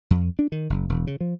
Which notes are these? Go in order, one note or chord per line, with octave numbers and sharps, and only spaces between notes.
F2
D4
D#3
F#1
E1
C#3
F3